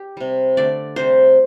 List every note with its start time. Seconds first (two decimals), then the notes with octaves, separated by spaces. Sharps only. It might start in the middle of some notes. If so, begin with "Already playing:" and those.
Already playing: G4
0.17 C3 G3
0.57 D3 A3 D5
0.96 C3 G3 C5